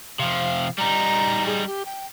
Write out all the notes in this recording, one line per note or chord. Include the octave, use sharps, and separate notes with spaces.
C3 F3 F5
G3 D#4 A#5
G#4
G4
G5